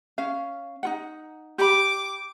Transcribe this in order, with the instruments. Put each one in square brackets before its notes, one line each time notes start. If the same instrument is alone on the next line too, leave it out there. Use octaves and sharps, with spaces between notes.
[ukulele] C#4 F5
D#4 F4 F#5
[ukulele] G4 B5 [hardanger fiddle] D6